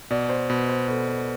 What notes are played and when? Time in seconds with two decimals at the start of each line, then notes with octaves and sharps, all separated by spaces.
0.11 B2 D5
0.29 C5
0.50 B2 B4
0.69 C5
0.88 B2 A4
1.08 B4